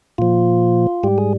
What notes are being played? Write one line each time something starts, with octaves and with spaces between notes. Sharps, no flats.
A#2 F3 F4
G#2 G3 G4
G#4